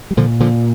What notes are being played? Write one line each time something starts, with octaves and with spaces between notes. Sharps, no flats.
G3
A#2 D3 F3
A#2 D3 F3